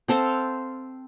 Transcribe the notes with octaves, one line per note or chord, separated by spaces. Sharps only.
C4 A4 C5 F5